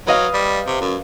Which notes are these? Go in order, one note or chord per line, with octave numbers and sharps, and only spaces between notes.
F#3 B4 D#5 F5
G3
C3
F#2